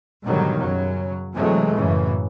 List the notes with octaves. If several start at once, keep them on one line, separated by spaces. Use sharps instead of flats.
G#2 B2 D3 D#3 F#3 G3
F#2 C#3 F#3
C3 E3 F#3 G#3 A3
F#2 A2 C#3 E3